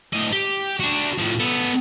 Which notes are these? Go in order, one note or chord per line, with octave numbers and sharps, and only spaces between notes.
A2 D#5
G4
D4 F#4
A2 F3
B3 A4